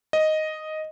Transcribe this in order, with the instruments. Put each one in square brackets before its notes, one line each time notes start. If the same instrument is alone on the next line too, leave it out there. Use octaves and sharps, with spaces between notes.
[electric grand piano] D#5